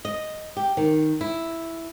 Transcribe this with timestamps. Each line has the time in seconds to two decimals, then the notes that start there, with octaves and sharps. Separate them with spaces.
0.05 D#5
0.56 G4
0.77 D#3
1.21 E4